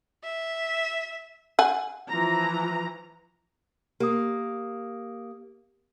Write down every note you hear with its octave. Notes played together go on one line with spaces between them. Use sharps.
E5
F#5 G#5
E3 F3 A#5
A#3 G4 D#6